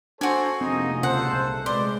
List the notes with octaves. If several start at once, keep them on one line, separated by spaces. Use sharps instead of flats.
D4 F#4 A4 C5 G#5
F1 F3 A#3 C4 D#4 G#4 D#5
D1 C#3 G#3 A4 C5 F#5
C2 A#2
C3 G#3 A3 B4 C5 D5